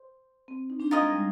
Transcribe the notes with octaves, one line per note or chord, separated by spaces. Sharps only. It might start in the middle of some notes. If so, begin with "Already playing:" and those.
Already playing: C5
C4
D#4
D4
F4 A#4 D#5 G#5
G#3
G3